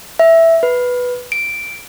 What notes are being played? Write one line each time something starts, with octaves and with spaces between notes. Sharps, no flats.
E5
B4
D7